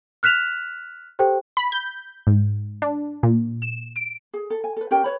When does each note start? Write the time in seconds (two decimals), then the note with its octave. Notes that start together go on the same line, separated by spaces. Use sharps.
0.23 F6 F#6 B6 E7 F7
1.19 G4 A4 C5 G5
1.57 B5
1.72 G6
2.27 G#2
2.82 D4
3.23 A#2
3.62 E7
3.96 D7
4.33 G#4
4.50 A4
4.64 G#5
4.77 A4 B4
4.91 C#4 G4 A#4 G5
5.04 B4 C#5 B5